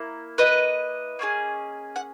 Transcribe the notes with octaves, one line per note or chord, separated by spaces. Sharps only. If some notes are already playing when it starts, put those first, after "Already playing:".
Already playing: A#3 E4
B4 D#5
A#3 C#4 E4 G#4
F#5